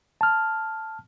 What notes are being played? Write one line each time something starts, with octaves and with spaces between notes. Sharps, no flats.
A5 F6